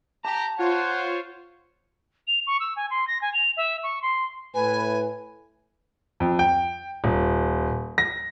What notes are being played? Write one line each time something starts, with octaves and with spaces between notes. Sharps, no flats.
G4 A5 A#5
F4 C5 C#5 F#5
F7
C#6
E6
G#5
C6
A#6
G#5
F7
E5
C#6
C6
A2 B4 G#5
F2
G5
D#1
A#6